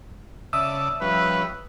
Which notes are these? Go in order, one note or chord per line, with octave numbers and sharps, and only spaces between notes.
C#3 D5 E5 A5 D#6 E6
F3 G3 C#4 B4